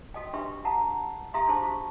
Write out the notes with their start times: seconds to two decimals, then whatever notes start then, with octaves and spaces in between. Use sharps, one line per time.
0.14 F#4 A4 D#5 G5
0.33 D4 G4 B4 E5 C6 C#6
0.65 F#5 A5 A#5
1.34 G4 A4 E5 F5 A#5 C6
1.47 D4 G#4 C5 A5 C6 C#6
1.62 F#4 C#6